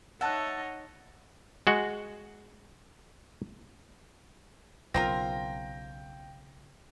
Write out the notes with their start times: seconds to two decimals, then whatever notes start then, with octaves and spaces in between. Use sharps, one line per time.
0.21 D#4 C#5 D#5 E5 F#5 A5 F#6
1.67 G#3 F#4
4.94 B1 C#3 C4 F4 A#4 G5 A#6